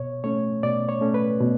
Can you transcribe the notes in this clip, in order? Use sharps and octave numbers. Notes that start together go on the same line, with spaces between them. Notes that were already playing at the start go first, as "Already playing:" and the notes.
Already playing: B2 C#5
A3 C#4 C#5
B2 D5
C#5
A3 C#4
B4
B2